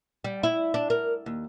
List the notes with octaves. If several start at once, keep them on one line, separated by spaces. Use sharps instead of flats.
G3
E4
D4
A#4
D#2